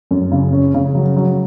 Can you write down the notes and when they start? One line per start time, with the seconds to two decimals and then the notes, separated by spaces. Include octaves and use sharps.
0.11 F#2
0.32 C#3
0.52 C#4
0.74 C#3
0.95 F#3
1.17 F#3